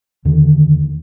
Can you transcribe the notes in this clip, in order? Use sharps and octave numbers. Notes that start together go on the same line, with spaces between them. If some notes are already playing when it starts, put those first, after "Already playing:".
E2 D3 D#3